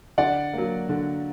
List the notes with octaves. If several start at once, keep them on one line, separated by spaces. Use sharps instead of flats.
D3 D5 F#5
F#3 A#3
D3